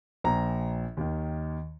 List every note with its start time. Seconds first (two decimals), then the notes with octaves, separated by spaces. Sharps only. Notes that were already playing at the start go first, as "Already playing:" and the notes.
0.24 A#1 A#2 A#5
0.97 D#2 D#3